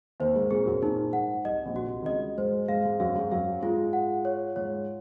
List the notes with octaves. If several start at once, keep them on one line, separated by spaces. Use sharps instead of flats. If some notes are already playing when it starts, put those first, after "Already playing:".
D#2 D#3 C5
G#2 G#3
A#2 A#3 G#4
F#2 F#3
A#2 A#3 D#4
G#2 G#3 F#5
C2 C3 D#5
A#1 A#2
F#4
C2 C3
D#3
C#2 C#3 D#5
G#2 G#3 C5
G#2 G#3 F5
G#2 G#3
F#2 F#3 F5
G#2 G#3
F#2 F#3 F5
G#2 G#3 F4
F#5
C#5
G#2 G#3 C#5